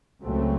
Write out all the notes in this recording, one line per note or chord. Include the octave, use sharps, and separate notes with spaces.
C#2 C#3 F#3 A3 C4